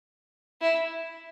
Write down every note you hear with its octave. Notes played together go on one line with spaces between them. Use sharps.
E4